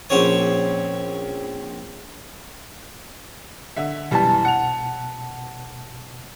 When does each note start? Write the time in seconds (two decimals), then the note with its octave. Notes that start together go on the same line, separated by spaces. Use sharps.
0.10 A#1 C4 C#4 C#5 D#6
3.76 D3 E5
4.11 F#2 B2 E3 G3 A5
4.45 F#5 F7